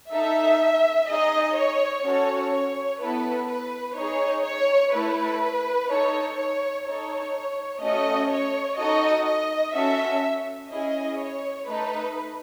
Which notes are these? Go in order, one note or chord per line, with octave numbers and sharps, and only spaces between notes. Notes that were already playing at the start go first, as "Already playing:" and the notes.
D#4 A4 E5
D#4 G#4 D#5
C#5
C#4 F#4 A4 C#5
C#5
B3 E4 A4 B4
B4
D#4 G#4 C#5
C#5
A3 E4 A4 B4
D#4 A4 C#5
C#5
D#4 A4 C#5
A3 C#4 F#4 A4 D#5
C#5
D#4 F#4 A4 D#5
D#5
C#4 F#4 A4 E5
C#4 E4 G#4 D#5
C#5
A3 D#4 A4 B4